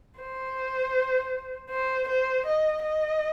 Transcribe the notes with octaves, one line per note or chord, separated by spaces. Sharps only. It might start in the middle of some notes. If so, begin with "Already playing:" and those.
C5
C5
C5
D#5
D#5